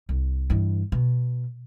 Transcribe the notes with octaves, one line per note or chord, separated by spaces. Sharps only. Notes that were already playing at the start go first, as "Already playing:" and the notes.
C2
G2 E3
B2